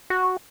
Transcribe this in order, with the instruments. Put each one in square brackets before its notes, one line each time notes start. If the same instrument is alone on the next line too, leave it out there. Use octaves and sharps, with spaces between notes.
[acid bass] F#4